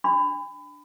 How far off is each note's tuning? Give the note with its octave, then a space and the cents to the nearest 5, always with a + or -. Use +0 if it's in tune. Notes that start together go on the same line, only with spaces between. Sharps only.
D4 +0 B5 +30